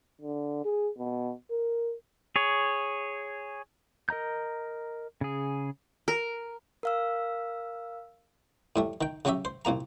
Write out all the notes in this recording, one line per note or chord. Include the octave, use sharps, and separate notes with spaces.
D3
G#4
B2
A#4
G#4 C#5
A#4 D#5 A#5 G6
C#3 G#4
A#4
A#4 F5 E6
A2 G3 A3
D#3 G5
C#3 F#3 C#4 G4 E5
C5
C2 A#2 A#3 A#5